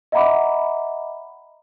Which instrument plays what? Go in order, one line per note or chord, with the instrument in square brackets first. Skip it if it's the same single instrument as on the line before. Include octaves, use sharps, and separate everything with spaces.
[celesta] D#5 E5 F#5 A#5 B5 D6